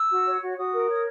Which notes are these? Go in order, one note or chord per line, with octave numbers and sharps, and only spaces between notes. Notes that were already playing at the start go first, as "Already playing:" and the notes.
Already playing: E6
F#4
C#5
F#4
F#4 D#6
A#4
C#5